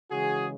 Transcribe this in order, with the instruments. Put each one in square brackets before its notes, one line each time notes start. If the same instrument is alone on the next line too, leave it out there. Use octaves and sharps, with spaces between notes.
[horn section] C#3 E3 G#3 F#4 G#4